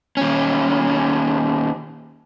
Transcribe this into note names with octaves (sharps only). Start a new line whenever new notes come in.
D#2 C#4